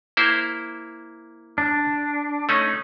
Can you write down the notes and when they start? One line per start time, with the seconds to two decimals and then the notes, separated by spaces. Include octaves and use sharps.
0.17 A#3 E4 C5
1.58 D4
2.49 A3 C#4 D#4